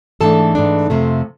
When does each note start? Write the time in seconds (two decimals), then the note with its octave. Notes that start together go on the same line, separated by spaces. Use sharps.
0.21 G#2 E3 A3 D4 A4 A5
0.55 G#2 E3 A3 D4
0.90 F2 C3 F3 A3